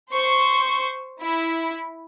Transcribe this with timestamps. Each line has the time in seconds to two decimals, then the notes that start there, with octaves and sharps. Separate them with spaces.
0.12 C5 C#6
1.20 E4